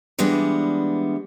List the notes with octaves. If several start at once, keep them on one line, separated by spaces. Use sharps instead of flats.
E3 G3 G#3 B3 D4